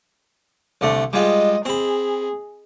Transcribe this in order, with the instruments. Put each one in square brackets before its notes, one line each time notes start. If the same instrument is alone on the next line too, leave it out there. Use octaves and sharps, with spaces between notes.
[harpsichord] C2 D3 A3
[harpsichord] G3 G#3 F4 [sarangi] D#5
[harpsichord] C4 B5 [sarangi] G#4